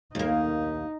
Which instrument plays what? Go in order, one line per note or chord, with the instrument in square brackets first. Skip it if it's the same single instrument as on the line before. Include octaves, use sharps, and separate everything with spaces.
[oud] D#2 A#3 [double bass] D#4